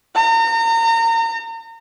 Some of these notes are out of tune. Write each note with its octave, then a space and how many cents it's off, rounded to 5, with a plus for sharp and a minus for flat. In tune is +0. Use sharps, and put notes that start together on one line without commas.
A#5 -35